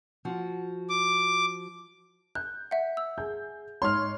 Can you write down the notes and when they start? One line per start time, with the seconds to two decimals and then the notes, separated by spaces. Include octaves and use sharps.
0.25 F3 F#4
0.90 D6
2.35 F#6 G6
2.71 E5 F#5
2.97 E6
3.18 G#4 G6
3.82 G#2 C#5 C6 F6